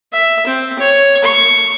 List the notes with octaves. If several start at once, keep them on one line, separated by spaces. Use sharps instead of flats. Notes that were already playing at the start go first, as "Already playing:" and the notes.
E5
C4
C#5
C#6